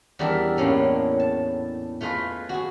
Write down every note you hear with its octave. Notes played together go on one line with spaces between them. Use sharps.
E2 G3 D4 A4 A#4 E5
A2 G#3 A#3 C#4 D4
A5
A3 F4 G#4 B4 D#5
F#4 G#4